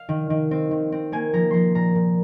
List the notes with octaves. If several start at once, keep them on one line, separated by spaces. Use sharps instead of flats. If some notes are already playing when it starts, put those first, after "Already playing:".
Already playing: F5
D#3
D#3
C4
D#3
C4
A#3 G#5
F3 A#5
F3 A#5 C6
A#2 A#5
A#2